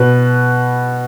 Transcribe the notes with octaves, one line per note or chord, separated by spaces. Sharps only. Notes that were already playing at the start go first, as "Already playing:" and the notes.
Already playing: B2 B4